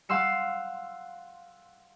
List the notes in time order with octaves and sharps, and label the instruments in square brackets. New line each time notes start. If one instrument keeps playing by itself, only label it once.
[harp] F5 F#5 C6 E6 C#7